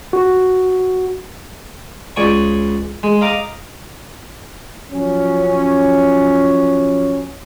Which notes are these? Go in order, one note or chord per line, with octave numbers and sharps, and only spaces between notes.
F#4
C#2 D5 G#5 C#6
G#3
D#5 F5 A#5 D6
F3 F#3 C#4